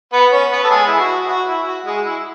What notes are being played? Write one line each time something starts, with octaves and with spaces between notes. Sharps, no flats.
B3 B4
C#4 C#5
B3 B4
A4
G#3 G#4
E4
F#4
F#4
E4
F#4
G#3 G#4
E4